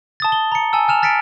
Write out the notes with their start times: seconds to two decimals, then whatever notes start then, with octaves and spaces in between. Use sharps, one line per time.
0.20 A5 D#6 A6
0.32 G7
0.52 A#5 C#7
0.73 G#5 A5 E6
0.88 G#5 F6 E7 F7
1.02 F6 A6 B6 C#7 D7